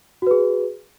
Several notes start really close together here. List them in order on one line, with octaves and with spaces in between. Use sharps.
F#4 B4 G#4